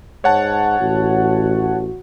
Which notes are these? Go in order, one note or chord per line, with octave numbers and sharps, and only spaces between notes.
G#2 C#5 F#5 A5
A1 F#4